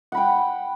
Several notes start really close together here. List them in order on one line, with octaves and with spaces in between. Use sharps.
F#5 B5 G5